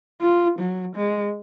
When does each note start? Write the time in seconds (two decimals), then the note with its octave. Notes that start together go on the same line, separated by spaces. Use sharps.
0.21 F4
0.59 F#3
0.95 G#3